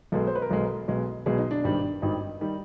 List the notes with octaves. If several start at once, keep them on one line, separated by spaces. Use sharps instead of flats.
B1 B2 G#3 A4
C5
B4
A#4
B1 B2 G#3 A4
B1 B2 G#3
B1 B2 G#3 G#4
D#4
D4
G#1 G2 D#3 G3
G#1 G2 D#3 G3 D#4
D#3 G3